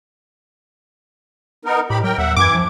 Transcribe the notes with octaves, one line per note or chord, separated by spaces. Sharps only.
B3 D#4 A#4
A2 G4 B5
F#3 A#4 G5
D#2 E5 F#5
F#2 E3 D6 G#6
F3